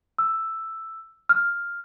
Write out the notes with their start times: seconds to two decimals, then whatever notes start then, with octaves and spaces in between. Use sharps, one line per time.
0.18 E6
1.29 F6